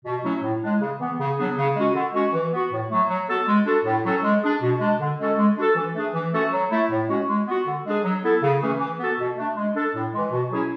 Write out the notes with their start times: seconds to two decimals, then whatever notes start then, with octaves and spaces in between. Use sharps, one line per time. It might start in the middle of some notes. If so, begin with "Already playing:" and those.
0.05 B2
0.24 F#3 A3 C#4 E4
0.43 A2
0.62 G#3 D4
0.80 C#3
0.99 E3 B3
1.19 C#3
1.38 F#3 B3 D4 G#4
1.57 C#3
1.75 G#3 C#4 F#4
1.94 D3
2.13 G#3 C#4 F#4
2.33 E3
2.52 B3 F#4
2.71 A2
2.90 F#3 A3
3.08 F#3
3.28 B3 F#4 A4
3.47 G#3
3.66 D4 F#4 A4
3.85 A2
4.04 F#3 C#4 F#4 A4
4.22 G#3
4.42 D4 G#4
4.62 B2
4.80 G#3 D4
5.00 D3
5.19 G#3 C#4 F#4 A4
5.37 G#3
5.56 D4 F#4 A4
5.76 E3
5.94 A3 D4 G#4
6.14 E3
6.32 A3 C#4 F#4 A4
6.52 F#3
6.70 A3 E4
6.90 A2
7.08 G#3 C#4 F#4
7.28 G#3
7.47 B3 F#4
7.66 D3
7.85 G#3 D4 G#4
8.04 F#3
8.23 B3 E4 A4
8.42 C#3
8.61 E3 A3 C#4 G#4
8.79 E3
8.99 B3 F#4 A4
9.18 B2
9.37 A3 D4
9.56 G#3
9.75 D4 A4
9.94 A2
10.13 E3 G#3
10.31 B2
10.50 F#3 C#4 E4 G#4